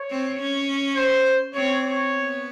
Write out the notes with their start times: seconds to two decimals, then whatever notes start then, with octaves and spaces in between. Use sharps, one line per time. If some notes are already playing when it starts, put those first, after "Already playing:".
Already playing: C#5
0.10 C4
0.39 C#4
0.96 C5
1.54 C4 C#5
1.84 C#5
2.13 B3